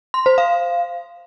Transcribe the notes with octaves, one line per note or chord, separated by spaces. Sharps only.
C6
C5
F5